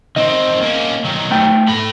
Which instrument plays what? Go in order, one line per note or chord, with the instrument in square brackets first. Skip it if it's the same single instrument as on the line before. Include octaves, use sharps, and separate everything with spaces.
[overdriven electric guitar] D#3 C4 [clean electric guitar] D#5
[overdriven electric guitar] A#3 C#4
D#3 F#3
[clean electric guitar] A3 B3 G5
[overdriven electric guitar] A4 B5